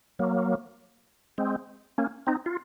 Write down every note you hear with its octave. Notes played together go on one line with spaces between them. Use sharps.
F#3 A#3
G#3 C4
A#3 C#4
C4 D#4
F4